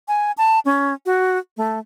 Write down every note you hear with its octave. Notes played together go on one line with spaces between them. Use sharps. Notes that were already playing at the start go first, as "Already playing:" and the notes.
G#5
A5
C#4
F#4
A3